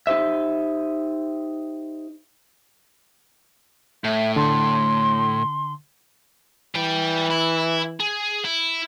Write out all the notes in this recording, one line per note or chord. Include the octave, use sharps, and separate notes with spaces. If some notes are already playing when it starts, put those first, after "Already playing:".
D#4 G4 C5 E5
A2 E5
D3 A5 C6
E3 G3 G5
E4
G#4
E4